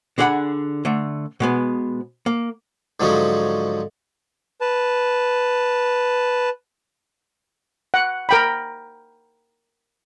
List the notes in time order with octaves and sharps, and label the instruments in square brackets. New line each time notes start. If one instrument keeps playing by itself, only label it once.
[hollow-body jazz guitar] D3 D4 G#4 B4 F#5 B5
D3 A3
B2 G#3 B3
A#3
[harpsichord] G#2 D3 F3 F#3 G#3 C#4
[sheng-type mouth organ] B4 A5
[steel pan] F#5
A#4 G5 B5